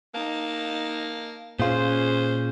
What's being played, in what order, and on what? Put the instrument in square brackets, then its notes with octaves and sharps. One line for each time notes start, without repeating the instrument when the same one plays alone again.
[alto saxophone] A#3 [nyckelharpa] D#4 A5
[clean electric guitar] A#2 F4 [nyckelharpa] C#4 G#4 [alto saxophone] C5